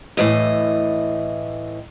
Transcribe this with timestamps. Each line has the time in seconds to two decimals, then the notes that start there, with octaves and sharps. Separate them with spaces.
0.17 A2 E3 D#5